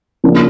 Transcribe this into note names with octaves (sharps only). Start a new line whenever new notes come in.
C#3 F3 A#3 D4